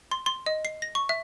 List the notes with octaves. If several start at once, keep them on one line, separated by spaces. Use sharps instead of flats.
C6
C6
D#5
C7
A#6
C#6
E5